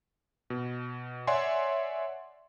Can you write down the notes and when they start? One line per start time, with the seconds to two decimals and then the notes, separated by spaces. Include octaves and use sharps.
0.50 B2
1.27 C#5 D5 E5 F#5 G#5 C6